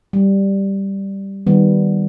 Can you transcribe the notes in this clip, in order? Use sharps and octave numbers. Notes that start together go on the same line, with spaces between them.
G3
D#3 G3 B3